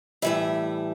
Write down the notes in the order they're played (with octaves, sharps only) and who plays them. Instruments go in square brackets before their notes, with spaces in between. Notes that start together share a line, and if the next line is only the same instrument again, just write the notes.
[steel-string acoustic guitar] A2 E3 G3 E5